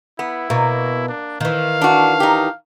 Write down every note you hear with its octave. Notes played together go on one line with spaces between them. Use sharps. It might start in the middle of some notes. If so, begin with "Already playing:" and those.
B3 E4
B2 A#3
D4
D#3 E3 F5
D4 F#4
D#4 G4